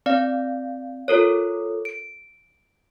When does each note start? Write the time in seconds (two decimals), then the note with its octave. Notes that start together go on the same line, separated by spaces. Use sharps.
0.06 C4 D5 F5
1.08 F4 A4 A#4 C#5
1.85 D7